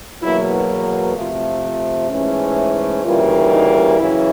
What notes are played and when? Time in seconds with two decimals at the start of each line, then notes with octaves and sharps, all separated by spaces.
0.21 E2 B2 F#3 A#3 E4
1.15 C3 F3 A3 F4
1.62 F4
2.10 G#2 E3 A3 C#4
3.04 D2 C#3 E3 G3 A#3 F4
3.51 D#4
3.98 F#2 C#3 E3 E4